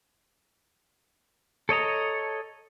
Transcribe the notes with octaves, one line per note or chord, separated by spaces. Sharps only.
A4 C#5 D#5 A#5